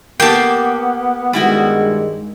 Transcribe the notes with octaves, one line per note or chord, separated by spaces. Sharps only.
A#3 B3 G4 G5 A5
G2 D#3 G3 G#3 E4 F#4